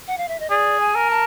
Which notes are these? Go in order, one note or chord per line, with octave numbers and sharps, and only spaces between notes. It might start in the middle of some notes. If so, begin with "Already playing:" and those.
F#5
F5
E5
D#5
G#4 D5
G#5
A#4
A5